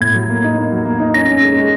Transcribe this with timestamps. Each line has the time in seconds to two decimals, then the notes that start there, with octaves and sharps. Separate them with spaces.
0.01 A2 G#6
0.15 F#3
0.29 A#3
0.44 D#4
0.57 A#3
0.72 F#3
0.85 A#3
1.00 D#4
1.14 C#4 A#6
1.29 C#4
1.42 G#3
1.56 G#3